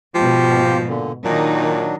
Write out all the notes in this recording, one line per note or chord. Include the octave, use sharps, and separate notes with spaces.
G#2 B2 F3 F4 G4 G5
A#2 D3
A#2 D#3 F#3 D4 D#4